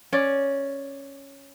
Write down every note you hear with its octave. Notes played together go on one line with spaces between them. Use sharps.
C#4 D5